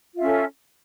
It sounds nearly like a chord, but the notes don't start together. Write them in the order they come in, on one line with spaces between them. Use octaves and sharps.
F4 E5 C#4 A4